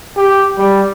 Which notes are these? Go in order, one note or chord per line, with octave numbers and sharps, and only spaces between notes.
G4
G3